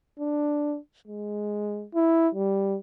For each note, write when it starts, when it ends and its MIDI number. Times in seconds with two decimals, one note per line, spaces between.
0.19 0.77 62
1.07 1.86 56
1.94 2.28 64
2.35 2.77 55